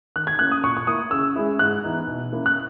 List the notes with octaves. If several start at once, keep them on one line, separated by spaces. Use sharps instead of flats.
D#3 F#6
G#6
A#3 C#4 E4 F#6
D#6
A#2 C#6
C#6
A#3 E4 D#6
C#3 E6
G#3 C#4 E4
G#2 F#6
E3 B3 D#4
B2
A#3 C#4 E4
F#6